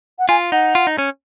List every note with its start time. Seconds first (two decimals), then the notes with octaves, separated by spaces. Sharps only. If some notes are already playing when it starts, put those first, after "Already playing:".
0.19 F#5
0.29 F4 G#5
0.52 D#4 F#5
0.75 F4
0.87 D#4
0.98 C#4